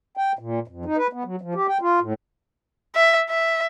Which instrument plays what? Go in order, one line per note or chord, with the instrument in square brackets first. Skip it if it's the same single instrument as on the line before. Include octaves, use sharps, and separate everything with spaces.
[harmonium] G5
A#2
F2
D#4
B4
B3
F#3
F3
G4
G5
F4
A2
[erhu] E5
E5